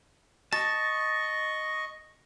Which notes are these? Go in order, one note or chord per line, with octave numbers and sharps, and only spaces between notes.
D#5 A5 C#6 A6